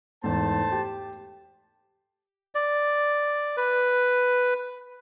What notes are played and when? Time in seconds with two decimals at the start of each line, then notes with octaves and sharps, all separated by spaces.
0.24 E2 G#2 A3 C5 A5
0.72 G4
2.55 D5
3.57 B4